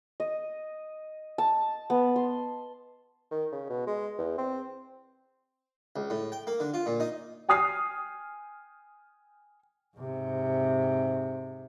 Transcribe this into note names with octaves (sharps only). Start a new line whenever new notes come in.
D#5
A5
B3
C6
D#3
C#3
B2
G#3
E2
C4
C#2
A2
G5
A#3
D3
F4
A#2
D#4
G5 G#5 D#6 F6 C7
G#2 C3